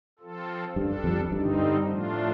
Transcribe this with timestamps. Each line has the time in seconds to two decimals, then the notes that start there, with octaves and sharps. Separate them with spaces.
0.19 F3 C4 F4 A4
0.75 G2 G3 D4 A4
1.04 F2
1.32 G2 D3 G3 C4 D#4
1.88 A2 F3 A3 D4 F4